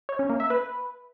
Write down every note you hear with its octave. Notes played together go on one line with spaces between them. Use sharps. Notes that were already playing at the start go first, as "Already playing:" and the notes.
C#5
C#4
A#3
E5
B4